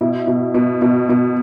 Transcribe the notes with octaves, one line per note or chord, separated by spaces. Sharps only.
B2 E4
B2
B2
B2
B2